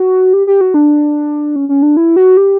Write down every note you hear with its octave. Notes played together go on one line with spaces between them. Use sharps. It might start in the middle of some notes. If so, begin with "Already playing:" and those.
Already playing: F#4
G4
G4
F#4
D4
C#4
C#4
D4
E4
F#4
G4